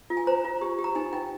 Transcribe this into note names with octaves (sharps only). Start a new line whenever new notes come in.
F4
G#5
C5 A#5
F4
G4
G4
A#5
D#4 G#5
D#4 G5